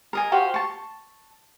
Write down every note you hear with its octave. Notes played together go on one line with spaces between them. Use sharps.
A#4 D#5 G#5
F#4 G4 C5 F5
A5 C#6